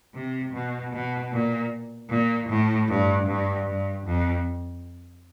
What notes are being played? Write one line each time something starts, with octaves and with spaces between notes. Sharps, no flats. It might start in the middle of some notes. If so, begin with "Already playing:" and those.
C3
B2
B2
A#2
A#2
A2
G2
G2
G2
F2